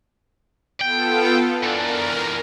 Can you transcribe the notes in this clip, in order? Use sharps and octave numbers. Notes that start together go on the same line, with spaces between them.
B3 F4 A4 G5
E3 D4 A#4